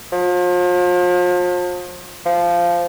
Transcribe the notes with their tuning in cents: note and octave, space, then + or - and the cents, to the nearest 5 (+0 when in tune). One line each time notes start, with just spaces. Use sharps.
F3 +40
F3 -10